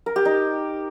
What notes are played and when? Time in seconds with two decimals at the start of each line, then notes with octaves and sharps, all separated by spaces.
0.06 A#4
0.16 G4
0.25 D#4